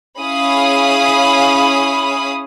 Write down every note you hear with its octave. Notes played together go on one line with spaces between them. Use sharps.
C#4 E4 G#4 F5 B5 D#6